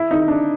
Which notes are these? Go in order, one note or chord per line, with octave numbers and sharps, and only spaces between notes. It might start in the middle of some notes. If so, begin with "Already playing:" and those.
Already playing: E4
D#4
D4